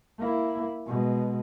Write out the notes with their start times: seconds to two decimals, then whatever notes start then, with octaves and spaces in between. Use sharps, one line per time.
0.19 A#3 E4
0.87 B2 G#3